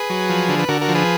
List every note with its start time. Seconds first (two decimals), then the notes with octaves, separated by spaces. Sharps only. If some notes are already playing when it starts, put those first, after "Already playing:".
Already playing: G#4 B4
0.10 F#3
0.29 F3
0.49 D3
0.59 B4
0.68 D3 F#4 A#4
0.81 F#4 A#4
0.88 F3
0.95 G#4 B4